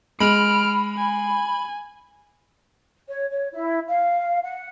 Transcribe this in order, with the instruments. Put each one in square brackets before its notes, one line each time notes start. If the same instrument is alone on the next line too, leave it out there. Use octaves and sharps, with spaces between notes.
[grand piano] G#3 [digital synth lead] B5 [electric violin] F6 D7
[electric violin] G#5
[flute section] C#5
C#5
E4
F5
F#5